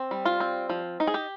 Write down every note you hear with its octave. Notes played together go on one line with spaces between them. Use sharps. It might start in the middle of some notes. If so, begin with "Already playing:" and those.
Already playing: C4
G3
F4
C4
F3
D#4
G#4
G4